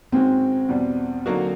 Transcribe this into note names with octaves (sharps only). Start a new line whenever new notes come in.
G#2 D#3 G#3 C4 C#4 F#4
E2 B2 G3
D3 F#3 A#3 D#4 F#4